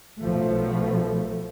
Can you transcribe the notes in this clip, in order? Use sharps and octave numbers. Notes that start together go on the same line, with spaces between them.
B1 F3 A3